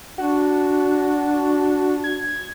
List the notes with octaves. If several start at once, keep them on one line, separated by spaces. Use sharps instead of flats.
D4 F#4
G#6